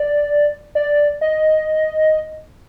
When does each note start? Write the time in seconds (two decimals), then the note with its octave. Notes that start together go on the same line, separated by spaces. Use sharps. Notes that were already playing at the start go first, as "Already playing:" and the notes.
Already playing: D5
0.75 D5
1.21 D#5